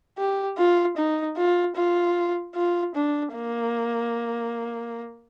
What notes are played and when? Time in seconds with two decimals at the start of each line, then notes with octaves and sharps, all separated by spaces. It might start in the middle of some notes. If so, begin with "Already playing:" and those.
0.18 G4
0.58 F4
0.97 D#4
1.37 F4
1.76 F4
2.55 F4
2.95 D4
3.35 A#3